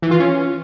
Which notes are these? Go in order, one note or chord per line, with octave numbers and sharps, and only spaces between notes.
E3
F4
C#4